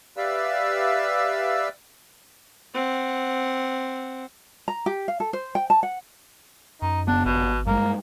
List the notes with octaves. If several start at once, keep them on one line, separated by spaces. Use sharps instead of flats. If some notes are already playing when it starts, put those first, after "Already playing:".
G4 B4 D5 E5 F5 E6
C4 F#5
A#5
G4
F5
A4
C5
G5
A5
F#5
F#2 D#4
F#1 B3 D4
G#1 B2
G2 G#3 A#3